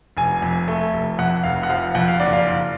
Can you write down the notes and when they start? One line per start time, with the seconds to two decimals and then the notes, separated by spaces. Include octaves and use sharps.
0.17 F1 G#5
0.42 F2
0.68 A3
0.94 F1
1.19 F2 F#5
1.44 F1 F5
1.63 F#5
1.70 F3 F5
1.95 F2 F#5
2.08 F5
2.20 F#1 D5
2.33 F5
2.46 F#1